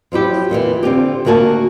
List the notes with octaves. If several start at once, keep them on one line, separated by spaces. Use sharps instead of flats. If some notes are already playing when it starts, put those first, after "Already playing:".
F3 F#3 E4 G4
F2 A#2 D3 E3
D3 C4 F4 G4
D2 D#3 A#3 F#4 G#5 A5